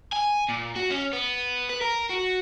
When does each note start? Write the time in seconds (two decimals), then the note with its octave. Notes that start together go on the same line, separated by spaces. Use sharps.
0.12 G#5
0.48 A#2
0.75 F#4
0.90 C#4
1.13 B3
1.69 B4
1.81 A#4
2.09 F#4